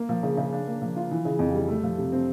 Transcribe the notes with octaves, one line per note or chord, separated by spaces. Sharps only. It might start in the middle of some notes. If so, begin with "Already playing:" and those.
Already playing: A#3
F3
C#3
C#3
D4
A#3
F3
F4
E3
C#3
F2
G3
A3
F3
C3
C4